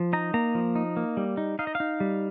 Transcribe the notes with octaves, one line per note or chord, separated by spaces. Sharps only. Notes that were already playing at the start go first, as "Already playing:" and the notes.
Already playing: F3
D#4 A#5
A#3 A#5
F3
D#4
A#3
G3
D#4
D#4 F5
D#5
F5
D#4
G3